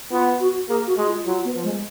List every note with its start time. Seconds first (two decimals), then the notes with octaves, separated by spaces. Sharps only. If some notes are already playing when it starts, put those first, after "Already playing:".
0.11 B3 F4
0.40 F#4
0.68 A#3 G#4
0.87 F#4
0.97 G#3
1.07 F4
1.26 F#3 F4
1.45 B3
1.55 F3
1.64 G#3